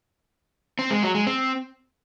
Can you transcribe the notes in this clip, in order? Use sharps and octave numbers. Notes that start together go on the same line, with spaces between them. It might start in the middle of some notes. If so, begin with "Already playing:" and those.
C4
G#3
F#3
G#3
C4